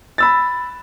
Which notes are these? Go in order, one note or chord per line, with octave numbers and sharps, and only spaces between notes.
B5 E6 A6